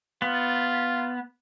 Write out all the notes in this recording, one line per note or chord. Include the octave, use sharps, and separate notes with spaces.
B3 F4